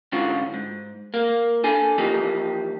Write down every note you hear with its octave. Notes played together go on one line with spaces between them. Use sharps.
G#2 D3 E3 C#4 F4 F#4
G#2
A#3
D4 A4 G#5
E3 F3 A#3 D#4 G4